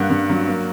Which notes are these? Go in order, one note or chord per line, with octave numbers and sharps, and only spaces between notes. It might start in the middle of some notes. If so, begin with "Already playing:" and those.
Already playing: G2 A#3 F#5
G2
F#3
A#3